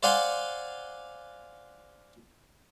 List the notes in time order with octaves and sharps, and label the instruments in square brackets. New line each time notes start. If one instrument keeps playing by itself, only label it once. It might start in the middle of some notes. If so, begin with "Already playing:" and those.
[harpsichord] C5 D5 F5 F#5 G#5 C6